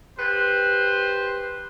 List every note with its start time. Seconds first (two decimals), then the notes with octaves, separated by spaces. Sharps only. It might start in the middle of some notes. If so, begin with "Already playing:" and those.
0.18 G4 B4 C5